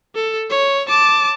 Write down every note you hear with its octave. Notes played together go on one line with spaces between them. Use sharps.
A4
C#5
A5 D6